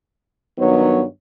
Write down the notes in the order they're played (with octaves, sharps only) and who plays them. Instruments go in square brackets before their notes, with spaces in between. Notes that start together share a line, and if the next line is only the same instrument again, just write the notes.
[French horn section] G2 D#3 F#3 B3 D#4 C#5